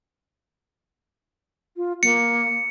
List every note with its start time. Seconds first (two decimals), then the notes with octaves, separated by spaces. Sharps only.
1.76 F4
2.03 A#3 C#7